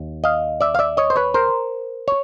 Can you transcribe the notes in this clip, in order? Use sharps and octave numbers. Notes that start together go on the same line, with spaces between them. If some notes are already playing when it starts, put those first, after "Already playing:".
Already playing: D#2
D#5 F5
D5 E5
F5
D5 E5
C#5 D#5
C5
B4 C#5
A#4 C5
C#5